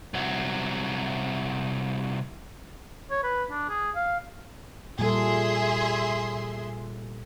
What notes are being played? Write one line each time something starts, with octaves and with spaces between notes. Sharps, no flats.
C2 F#3
C#5
B4
D4
G#4
F5
A#2 G3 G#4 A4 E5 C6